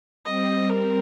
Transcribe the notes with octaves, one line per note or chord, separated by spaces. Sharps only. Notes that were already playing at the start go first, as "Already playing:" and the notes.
G3 C4 D#5
A#4